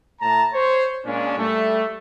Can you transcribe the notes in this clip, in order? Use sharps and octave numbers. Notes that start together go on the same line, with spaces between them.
A2 A5 A#5
C5 C#5
A#2 G#3 C#4 D4
G3 A3